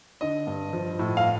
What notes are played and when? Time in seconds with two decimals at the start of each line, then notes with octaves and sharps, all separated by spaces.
0.21 D3 D#5
0.47 G2
0.73 F3
0.99 A2
1.17 F5